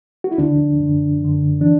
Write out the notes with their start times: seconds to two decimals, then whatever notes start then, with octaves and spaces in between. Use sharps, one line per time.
0.24 F#4
0.31 E4
0.38 D2 D3 D4
0.79 F#2 D3
1.20 F#2 D3
1.60 E3 D4